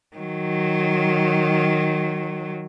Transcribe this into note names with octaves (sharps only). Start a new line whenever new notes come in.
D#3 F#3